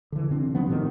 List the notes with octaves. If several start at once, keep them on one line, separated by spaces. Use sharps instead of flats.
D3 E3
C3 C4 D4
F3 G3 B3
A2 C3 D#3 A3